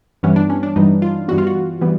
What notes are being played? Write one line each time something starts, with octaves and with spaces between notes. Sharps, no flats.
G2 E3 G3 B3 C#4
D4
C#4
D4
G2 E3 G3 B3 D#4
F4
G2 E3 G3 B3 F#4
F4
F#4
E3 G3 B3